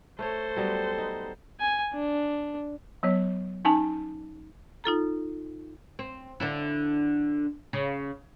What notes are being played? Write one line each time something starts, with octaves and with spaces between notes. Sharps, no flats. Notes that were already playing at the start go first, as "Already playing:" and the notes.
A3 A4 C5 C#5
F#3 G3 B3
D#4
G#5
D4
F#3 B3 C#5
C#4 D#4 G#5 A5
D#4 F4 A4 A#5
C4
D3 D4 E4
C#3